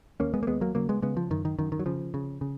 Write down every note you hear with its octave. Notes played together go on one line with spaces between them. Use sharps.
D#2 A#3 C#4
G#3 B3
A#3
D#2 G#3 B3
F#3 A#3
C#3 F#3 A#3
G#3 B3
C#3 G#3 B3
F3
F#2 D#3
D#3
F#2 D#3
D#3
F#3
C#3 F3
C#3
C#3